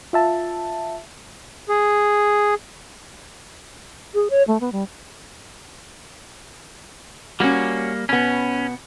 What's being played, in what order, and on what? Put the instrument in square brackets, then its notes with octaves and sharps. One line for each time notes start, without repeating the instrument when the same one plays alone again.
[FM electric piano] F4 E5 A5
[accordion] G#4
[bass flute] G#4
C#5
A3
B3
G3
[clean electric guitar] G3 A#3 [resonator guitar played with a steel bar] C#4 F#4
[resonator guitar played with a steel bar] B2 B3 [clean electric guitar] C#4